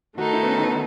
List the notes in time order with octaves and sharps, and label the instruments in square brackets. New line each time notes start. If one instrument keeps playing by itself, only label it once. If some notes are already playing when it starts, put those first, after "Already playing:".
[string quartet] D#3 A3 D#4 A4 [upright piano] F#4
[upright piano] E4
B3
C#4
B3